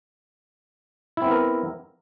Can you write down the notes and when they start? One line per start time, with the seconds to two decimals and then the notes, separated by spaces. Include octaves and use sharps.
1.17 E4
1.22 C4
1.26 B3
1.31 A#4